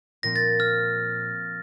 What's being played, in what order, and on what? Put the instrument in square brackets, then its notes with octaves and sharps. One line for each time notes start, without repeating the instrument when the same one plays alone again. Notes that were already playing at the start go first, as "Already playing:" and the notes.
[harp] A#2 F3 C4 [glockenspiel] A#6
[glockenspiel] A6
F6